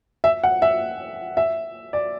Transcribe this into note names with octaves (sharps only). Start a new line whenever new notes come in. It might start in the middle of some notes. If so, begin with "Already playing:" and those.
E5
F#5
E5
E5
D5